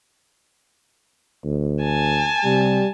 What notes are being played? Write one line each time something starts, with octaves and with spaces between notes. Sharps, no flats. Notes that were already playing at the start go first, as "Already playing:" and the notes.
D2
G#5 A5
C3 G3